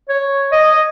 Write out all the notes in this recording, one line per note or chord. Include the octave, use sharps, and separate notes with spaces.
C#5
D#5